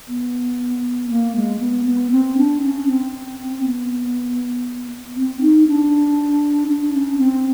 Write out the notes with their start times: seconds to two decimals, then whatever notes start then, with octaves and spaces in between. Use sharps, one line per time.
0.08 B3
1.10 A#3
1.36 G#3
1.60 B3
1.85 B3
2.11 C4
2.37 D4
2.62 C#4
2.87 C4
3.63 B3
5.16 C4
5.41 D#4
5.67 D4
6.68 D4
6.94 C#4
7.18 C4